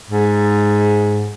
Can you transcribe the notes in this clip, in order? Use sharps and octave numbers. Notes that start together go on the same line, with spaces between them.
G#2